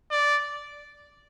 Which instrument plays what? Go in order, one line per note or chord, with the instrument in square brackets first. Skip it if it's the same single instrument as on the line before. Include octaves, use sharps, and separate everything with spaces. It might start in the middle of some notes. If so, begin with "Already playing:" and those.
[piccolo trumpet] D5